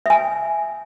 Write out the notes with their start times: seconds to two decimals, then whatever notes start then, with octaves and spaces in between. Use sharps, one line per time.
0.06 E5 G#5